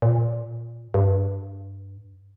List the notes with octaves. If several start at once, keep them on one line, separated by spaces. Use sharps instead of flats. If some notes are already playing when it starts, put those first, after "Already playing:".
A#2
G2